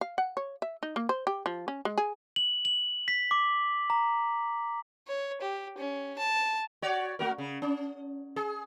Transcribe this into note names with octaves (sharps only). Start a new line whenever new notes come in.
F5
F#5
C#5
E5
D#4
A#3
C5
G4
F3
C#4
G#3
G#4
F#7
F#7
B6
D6
A#5
C#5
G4
C#4
A5
F#4 C#5 D5
A3 F#4 A#4
C#3
C#4
G#4